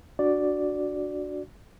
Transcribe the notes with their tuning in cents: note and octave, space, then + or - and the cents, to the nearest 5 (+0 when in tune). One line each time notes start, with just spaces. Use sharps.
D4 +0 F#4 +0 D5 +0